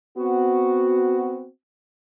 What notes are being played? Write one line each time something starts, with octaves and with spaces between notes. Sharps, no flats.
B3 C4 F#4